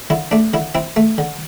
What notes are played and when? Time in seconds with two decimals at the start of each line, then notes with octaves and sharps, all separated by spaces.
0.10 D3 E4
0.31 A3 D4
0.54 D3 E4
0.75 C4 E4
0.96 A3
1.18 D3